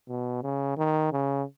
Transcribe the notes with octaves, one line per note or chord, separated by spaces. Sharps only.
B2
C#3
D#3
C#3